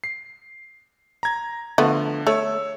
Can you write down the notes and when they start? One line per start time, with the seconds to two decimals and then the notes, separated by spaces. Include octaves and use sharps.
0.04 C7
1.23 A#5 G#6
1.78 D3 F3 A3 B3
2.27 A3 C#5 E6